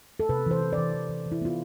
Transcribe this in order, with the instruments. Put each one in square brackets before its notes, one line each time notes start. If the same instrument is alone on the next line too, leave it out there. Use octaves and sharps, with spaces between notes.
[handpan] A4
C3 B4
E3 C5
E3
D5
E3
E3
E3
E3
E4
B3 F4